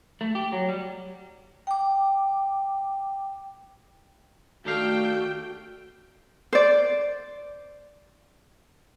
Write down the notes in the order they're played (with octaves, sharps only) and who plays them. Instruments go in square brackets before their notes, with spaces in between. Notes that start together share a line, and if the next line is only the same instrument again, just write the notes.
[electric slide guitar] A3
G4
F#3
G3
[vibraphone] G5 D6
[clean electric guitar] D#2 D4 F5 [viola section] A3 G5 [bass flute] F#4
[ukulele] C5 D5